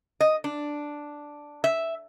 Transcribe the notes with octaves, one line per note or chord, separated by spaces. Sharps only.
D#5
D4
E5